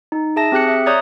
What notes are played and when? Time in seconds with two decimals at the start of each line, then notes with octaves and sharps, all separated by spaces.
0.12 D#4
0.36 G#4 E5 A5 A#6
0.52 C4 G4 G#4 F#6 C#7
0.68 E5
0.86 C#5 D5 A#5 D#6 F#6 G6